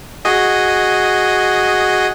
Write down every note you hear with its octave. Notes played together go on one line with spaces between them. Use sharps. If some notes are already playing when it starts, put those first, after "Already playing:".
F#4 G#4 D#5